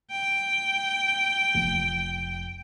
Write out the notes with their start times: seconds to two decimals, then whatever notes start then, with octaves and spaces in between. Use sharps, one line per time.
0.11 G5
1.55 F1